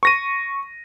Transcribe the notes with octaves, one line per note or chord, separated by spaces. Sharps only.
C#6 A#6 D#7